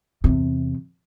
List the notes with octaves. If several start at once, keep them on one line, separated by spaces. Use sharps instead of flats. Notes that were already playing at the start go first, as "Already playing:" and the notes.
E2 C3